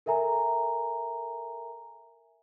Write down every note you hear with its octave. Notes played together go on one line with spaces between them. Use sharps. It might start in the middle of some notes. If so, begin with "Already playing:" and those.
A4 A#4 E5 G#5 A#5